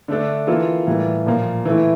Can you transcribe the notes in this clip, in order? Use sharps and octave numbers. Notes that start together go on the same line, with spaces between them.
D3 A3 D4 A4
E3 A#3 F4 A4
A2 E3 G3 A#3
A#2 F3 A#3
E3 A3 E4